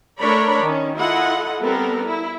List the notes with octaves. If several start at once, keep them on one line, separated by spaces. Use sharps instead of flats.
A3 D4 A#4 C#5 D5 B5
D#3 C#4
E4 F4 A4 D#5 F#5
G3 B3 C4 A4 A#4
E4